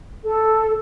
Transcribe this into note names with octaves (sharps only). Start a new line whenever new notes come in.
A4